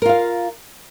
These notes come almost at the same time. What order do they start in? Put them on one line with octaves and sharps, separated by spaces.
A#4 F4 F5